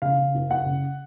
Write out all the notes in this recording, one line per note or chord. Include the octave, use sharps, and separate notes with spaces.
C#3 F5
C#3
F#1
F#1 F#5
C#3